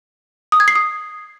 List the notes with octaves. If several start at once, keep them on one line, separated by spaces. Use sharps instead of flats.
D#6
G#6
C7
D#6